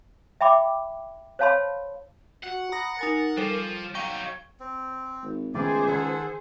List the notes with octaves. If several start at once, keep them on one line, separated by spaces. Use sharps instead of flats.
E5 G5 B5 D6
C5 C#5 F5 A5 B5 C6
F#4 F#5
A#5 B5 D#6 A#6
D#4 A#4 G#5 A6
F3 G3 F4 A4 C5
F#3 D#4 F5 G5 C#6 G7
C4
G#1
C#2 D#3 A3 B3 G4 G#4 C5 D5
D#3 A4 F#5